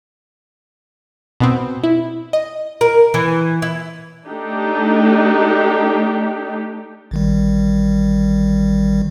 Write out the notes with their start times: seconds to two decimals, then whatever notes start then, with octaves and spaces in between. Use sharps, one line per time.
1.40 B2 B3 C4
1.84 E4
2.33 D#5
2.81 A#4
3.14 E3
3.62 E4
4.27 A3 D4 D#4 G4
7.11 A1 D#3 G3